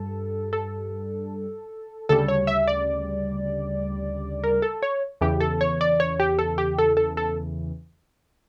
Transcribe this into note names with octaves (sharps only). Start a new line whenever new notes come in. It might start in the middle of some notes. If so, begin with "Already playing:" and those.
Already playing: G2 G3 A4
A4
D2 C#3 G3 A4
C#5
E5
D5
A#4
A4
C#5
E2 C#3 E3 G4
A4
C#5
D5
C#5
G4
A4
G4
A4
A4
A4